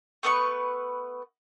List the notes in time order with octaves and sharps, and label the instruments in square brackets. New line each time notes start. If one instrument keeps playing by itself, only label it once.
[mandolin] A3 B3 B4 C#6